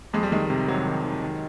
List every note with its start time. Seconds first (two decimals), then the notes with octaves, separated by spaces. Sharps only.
0.13 F2 G#3
0.23 G3
0.32 D#3 G#3
0.50 C3
0.68 D#3 F#3
0.86 D#3
1.05 D#3
1.22 D#3